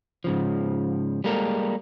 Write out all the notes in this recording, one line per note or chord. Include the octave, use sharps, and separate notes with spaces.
G#2 C#3 F3
G3 G#3 A#3 A4 A#4